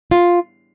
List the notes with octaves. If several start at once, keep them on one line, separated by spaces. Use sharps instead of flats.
F4